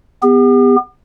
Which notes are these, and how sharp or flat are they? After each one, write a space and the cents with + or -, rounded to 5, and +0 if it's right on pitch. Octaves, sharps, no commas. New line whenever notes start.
B3 +10 G4 +45